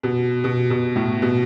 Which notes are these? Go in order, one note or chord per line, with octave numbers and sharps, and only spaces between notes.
B2
B2
B2
A2
B2